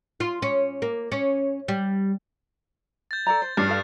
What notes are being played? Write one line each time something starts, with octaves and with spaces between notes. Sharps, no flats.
F4
C#4
A#3
C#4
G3
G6 A6
A4 D5 A#5
C5
G2 D4 G4 C#5 F6 A6 C7
A4 F5